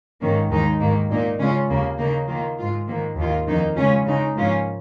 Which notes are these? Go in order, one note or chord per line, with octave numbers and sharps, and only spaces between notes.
G#2 D#3 A#3 C#4
D#2 D#3 G#3 D#4
G#2 D#3 A#3
A#2 A#3 D#4
C#3 G#3 C#4 F4
D#2 C#3 A#3
C#3 A#3 D#4
D#3 A#3 F4
G#2 G#3 F4
G#2 D#3 A#3
D#2 D#3 A#3 F4
F2 D#3 A#3 D#4
C#3 G#3 C#4 F4
C#3 G#3 D#4
G#2 F3 A#3 C#4 F4